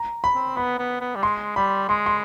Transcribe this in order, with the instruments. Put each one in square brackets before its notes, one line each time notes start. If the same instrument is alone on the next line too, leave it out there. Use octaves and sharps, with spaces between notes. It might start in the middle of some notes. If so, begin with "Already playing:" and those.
Already playing: [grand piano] A#5
B5
[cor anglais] C4
[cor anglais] B3 [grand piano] B5
[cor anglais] B3
B3
G3
[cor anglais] G#3 [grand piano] C6
[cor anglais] G3 [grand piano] B5
[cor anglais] G#3 [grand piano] C6
[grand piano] C6